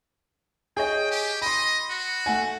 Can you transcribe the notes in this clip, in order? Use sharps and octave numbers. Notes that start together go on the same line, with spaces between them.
G#4 C#5 D#5 G5
G4
D#5 B5 C6
F#4
A3 F#5 G#5